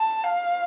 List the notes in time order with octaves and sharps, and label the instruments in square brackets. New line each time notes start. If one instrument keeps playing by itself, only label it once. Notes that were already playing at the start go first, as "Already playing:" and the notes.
Already playing: [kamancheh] A5
F5